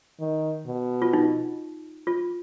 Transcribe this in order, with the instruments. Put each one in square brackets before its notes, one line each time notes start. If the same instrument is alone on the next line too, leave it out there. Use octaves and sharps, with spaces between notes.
[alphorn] D#3
B2
[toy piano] F4
D#4
F4